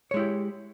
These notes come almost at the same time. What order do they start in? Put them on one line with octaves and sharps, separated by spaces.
C#5 G#3 E4 G4